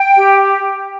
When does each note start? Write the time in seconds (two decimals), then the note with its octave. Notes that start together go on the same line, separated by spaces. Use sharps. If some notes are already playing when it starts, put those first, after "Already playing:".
Already playing: G5
0.17 G4